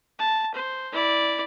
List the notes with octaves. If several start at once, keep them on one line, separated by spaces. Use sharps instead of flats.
A5
C5
E4 D5